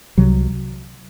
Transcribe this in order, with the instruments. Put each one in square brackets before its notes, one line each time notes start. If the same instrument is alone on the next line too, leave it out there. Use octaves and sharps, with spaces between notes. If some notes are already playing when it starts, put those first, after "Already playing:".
[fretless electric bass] C2 C3 F#3